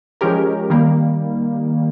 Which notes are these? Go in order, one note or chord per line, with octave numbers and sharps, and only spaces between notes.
F3 G#3 C#4 G4 A#4
D#3 G3 A#3